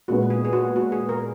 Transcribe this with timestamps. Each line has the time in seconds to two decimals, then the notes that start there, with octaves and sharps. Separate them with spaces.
0.08 A#2 G#3 B3 F#4
0.30 G#4
0.45 G#4
0.53 F#4
0.76 F#4
0.92 G#4
1.09 A#4